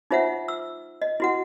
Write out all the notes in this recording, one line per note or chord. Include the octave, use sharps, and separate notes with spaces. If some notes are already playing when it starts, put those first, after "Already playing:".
D#4 F4 C5 E5 F#5
E6
D#5
E4 F#4 F#5